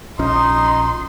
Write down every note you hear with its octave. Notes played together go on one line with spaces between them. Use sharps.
A#1 F3 C#4 D#4 C6